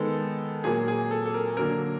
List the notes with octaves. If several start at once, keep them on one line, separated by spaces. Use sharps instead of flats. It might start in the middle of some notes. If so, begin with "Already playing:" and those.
Already playing: D#3 G#3 B3 A4
A#2 F#3 A#3 G#4
G#4
A4
A4
A#4
D3 F#3 A#3 A#4